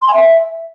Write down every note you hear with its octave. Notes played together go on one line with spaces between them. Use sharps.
C6
G#5
E5